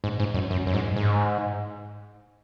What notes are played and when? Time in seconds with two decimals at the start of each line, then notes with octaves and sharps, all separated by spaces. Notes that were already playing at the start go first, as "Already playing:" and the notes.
0.04 G#2
0.20 G#2
0.34 F#2
0.50 F#2
0.67 F#2
0.74 G#2
0.96 G#2